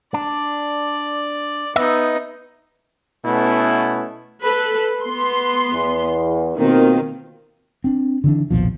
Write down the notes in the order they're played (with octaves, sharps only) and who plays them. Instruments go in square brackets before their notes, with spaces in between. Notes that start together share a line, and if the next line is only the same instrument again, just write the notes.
[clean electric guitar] D4 [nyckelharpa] D5
[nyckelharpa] B3 D#4 [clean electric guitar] D#5 E5
[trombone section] B2 A3 B3 C#4 E4
[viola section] A4 B4 B5
B3 C6
[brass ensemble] E2
[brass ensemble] B2 A#3 C4 [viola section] D#3 F4
[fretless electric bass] C4 D4
D3 E3 D4
A#1 D#2 B2 F3